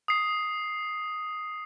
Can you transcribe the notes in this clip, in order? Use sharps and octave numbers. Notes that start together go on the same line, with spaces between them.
D#6 C7